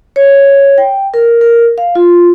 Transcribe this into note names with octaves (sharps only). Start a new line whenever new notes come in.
C#5
G5
A#4
A#4
F5
F4